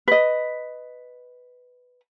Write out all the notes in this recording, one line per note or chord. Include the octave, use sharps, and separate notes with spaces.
B4 D#5